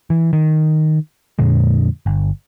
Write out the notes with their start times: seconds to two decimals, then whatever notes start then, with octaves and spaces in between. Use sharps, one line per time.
0.10 E3
0.33 D#3
1.39 F2 A#2 D3 G#3
2.06 G1